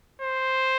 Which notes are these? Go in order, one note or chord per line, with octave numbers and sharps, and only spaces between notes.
C5